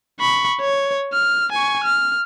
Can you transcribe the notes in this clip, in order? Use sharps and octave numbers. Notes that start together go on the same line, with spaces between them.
B5 C#6
C#5
F6
G#5 C#6
F6